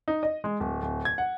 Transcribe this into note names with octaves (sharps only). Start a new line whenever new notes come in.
D#4
D#5
G#3
D1
D1
G#6
F#5